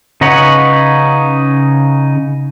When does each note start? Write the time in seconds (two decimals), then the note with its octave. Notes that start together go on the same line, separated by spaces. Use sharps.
0.21 C#3 D#4 B4 C#5 F#5